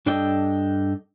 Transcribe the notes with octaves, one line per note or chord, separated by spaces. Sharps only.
G2 D4 A4 D5 D#5 G5